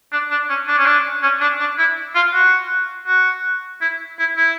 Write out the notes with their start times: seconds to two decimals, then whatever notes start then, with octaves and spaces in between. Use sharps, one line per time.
0.12 D4
0.30 D4
0.49 C#4
0.67 D4
0.78 C#4
0.86 D4
1.23 C#4
1.41 D4
1.59 D4
1.78 E4
2.15 F4
2.33 F#4
3.07 F#4
3.81 E4
4.19 E4
4.37 E4